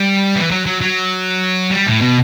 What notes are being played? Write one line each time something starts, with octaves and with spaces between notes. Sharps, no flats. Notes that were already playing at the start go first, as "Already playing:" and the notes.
Already playing: G3
E3
F#3
F#3
F#3
G3
A2
B2